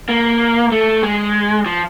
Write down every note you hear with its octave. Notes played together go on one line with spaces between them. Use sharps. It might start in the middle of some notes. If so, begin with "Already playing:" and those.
A#3
A3
G#3
F3